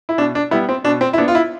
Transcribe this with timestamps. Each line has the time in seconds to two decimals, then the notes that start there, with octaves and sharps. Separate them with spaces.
0.09 E4
0.18 B2 D4
0.35 D4
0.51 G3 B3 E4
0.69 C4
0.84 B2 D4
1.01 C4
1.13 E4
1.18 B3 D4
1.28 F4
1.35 E4